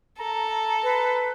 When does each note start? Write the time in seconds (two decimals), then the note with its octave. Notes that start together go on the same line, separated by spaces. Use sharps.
0.19 A4 A#5
0.83 B4